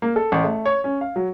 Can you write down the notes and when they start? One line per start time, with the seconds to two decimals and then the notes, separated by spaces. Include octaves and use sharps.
0.02 A#3
0.16 A4
0.32 A1
0.44 A3
0.65 C#5
0.84 C#4
1.01 F5
1.16 F#3